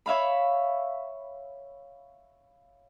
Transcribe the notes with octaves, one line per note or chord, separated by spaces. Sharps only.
C#5 E5 F5 B5